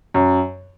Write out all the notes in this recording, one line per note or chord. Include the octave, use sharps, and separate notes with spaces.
F#2